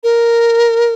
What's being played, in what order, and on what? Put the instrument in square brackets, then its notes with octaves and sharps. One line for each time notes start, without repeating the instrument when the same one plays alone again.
[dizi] A#4